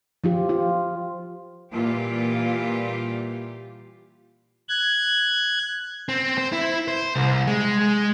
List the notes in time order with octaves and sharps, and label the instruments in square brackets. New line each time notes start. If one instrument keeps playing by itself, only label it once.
[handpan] F3 F4 G4
F4
[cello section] A#2 E3 G3 F4 G4
[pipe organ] F#6 G#6
[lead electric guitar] C4
C5
E4
C5
C2
G#3
G#3